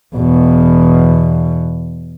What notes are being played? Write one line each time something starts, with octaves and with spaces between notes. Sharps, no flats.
E2 B2